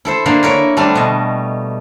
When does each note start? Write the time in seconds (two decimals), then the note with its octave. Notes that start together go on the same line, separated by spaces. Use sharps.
0.05 E4 A4 C5
0.26 D3 A#3 C5
0.43 E4 A#4 C#5
0.77 D3 G3 A3 C4 D4
0.95 B2 D#5